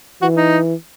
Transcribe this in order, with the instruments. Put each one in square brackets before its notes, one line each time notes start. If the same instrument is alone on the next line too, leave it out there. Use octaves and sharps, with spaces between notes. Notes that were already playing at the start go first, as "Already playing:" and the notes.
[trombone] E3 [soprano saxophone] F#4
[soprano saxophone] D#4